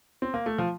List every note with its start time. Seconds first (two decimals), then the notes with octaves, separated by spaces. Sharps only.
0.22 C4
0.34 A#3
0.46 A3
0.58 F3